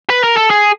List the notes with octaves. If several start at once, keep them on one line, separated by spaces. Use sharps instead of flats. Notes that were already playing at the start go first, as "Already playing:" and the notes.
B4
A#4
A4
G#4